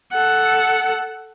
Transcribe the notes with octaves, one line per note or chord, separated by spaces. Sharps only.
A4 F#5